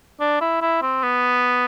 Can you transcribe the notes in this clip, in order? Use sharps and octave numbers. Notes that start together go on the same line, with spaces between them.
D4
E4
E4
C4
B3